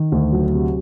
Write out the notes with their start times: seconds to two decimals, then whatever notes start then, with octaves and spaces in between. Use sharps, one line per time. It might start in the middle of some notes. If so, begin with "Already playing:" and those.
Already playing: D#3
0.12 D2
0.32 F#3
0.54 C3